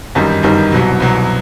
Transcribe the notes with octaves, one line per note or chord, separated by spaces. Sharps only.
G1 F#2 D#3 G3 D#4
G1 F#2 D#3 G3 D#4
C2 B2 F#3
C2 B2 F#3